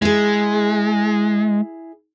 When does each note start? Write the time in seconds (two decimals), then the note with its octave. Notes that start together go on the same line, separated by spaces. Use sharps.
0.02 G#3 E4 G#4